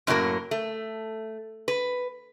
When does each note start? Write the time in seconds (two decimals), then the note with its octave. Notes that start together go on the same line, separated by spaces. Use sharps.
0.07 F#2 A2 D3 F#3 A#3 A#4
0.51 A3
1.68 B4